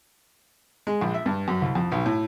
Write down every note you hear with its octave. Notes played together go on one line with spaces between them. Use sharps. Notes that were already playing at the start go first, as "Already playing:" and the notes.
G#3
A#1
E5
G2
F#2
C2
F2
B1
A2